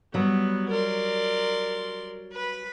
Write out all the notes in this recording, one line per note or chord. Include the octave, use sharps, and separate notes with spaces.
F#3 G3 B3
A#4 D5 C6
B4 B5